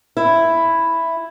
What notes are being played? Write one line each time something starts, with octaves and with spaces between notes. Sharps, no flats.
E4